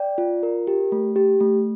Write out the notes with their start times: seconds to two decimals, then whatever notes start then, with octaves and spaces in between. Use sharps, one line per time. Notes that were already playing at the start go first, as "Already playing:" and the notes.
Already playing: D5 G5
0.18 F4
0.43 A#4
0.67 G4
0.92 A3
1.16 G4
1.40 A3